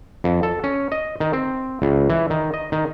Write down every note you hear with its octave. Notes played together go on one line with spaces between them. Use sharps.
F2
A4
C#4
D#5
D#3
C4
C#2
E3
D#3
D#5
D#3